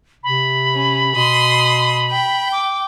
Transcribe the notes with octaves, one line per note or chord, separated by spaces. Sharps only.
C3 B5
C#4
B2 C6 D#6
G5
D6